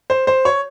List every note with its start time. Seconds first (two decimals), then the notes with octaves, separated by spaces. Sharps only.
0.10 C5
0.27 C5
0.45 C#5